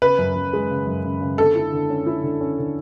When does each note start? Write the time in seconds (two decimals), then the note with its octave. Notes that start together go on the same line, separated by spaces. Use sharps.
0.02 C#3 B4
0.18 F#2
0.35 F#2
0.53 G#3
0.71 C#3
0.87 F#2
1.04 C#3
1.21 C#3
1.38 D3 A4
1.55 E4
1.73 D3
1.90 C#4
2.07 E4
2.23 D3
2.40 C#4
2.59 D3